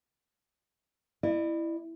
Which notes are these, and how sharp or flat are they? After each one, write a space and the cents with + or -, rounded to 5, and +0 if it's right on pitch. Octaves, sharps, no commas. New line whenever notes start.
E4 +0 D5 +45